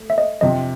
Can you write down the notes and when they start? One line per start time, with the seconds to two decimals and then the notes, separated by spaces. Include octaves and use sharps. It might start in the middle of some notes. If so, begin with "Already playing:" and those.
Already playing: A3
0.10 E5
0.18 D#5
0.41 F2 C3 F3 D#5